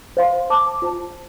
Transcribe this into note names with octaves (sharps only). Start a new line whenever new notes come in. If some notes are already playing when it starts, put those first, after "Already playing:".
C5 F5 C6
C5 A5 D6
F4 C5 A5